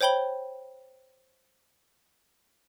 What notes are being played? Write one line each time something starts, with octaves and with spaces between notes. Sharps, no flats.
C5 C#5 G5 B5 G7